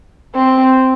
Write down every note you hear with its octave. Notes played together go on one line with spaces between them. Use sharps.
C4